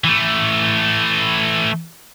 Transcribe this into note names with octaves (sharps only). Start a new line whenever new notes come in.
E3 A3